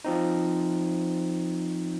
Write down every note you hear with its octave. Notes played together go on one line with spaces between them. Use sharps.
F3 C4 D#4